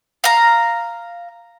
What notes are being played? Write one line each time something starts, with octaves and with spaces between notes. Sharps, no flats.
F5 A#5